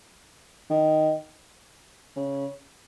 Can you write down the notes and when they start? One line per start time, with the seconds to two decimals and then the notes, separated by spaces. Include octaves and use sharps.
0.70 D#3
2.16 C#3